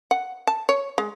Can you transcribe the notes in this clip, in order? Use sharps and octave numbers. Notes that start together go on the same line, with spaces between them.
F#5
A5
C#5
G#3